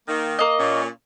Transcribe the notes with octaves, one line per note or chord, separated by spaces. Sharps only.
D#3 A#3
A#3 D#5
A#2 C#4